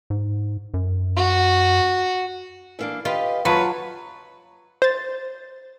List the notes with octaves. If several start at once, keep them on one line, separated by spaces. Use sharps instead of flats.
G#2
F#2
F#4
E3 A#3 D4
F4 G4 B4 D#5
F#3 F4 B4 C#5 A5 C#6
C5 A6